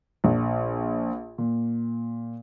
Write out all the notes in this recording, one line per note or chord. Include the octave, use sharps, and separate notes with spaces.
A#1
A#2